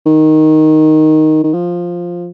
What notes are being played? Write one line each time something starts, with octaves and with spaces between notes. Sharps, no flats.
D#3
D#3
F3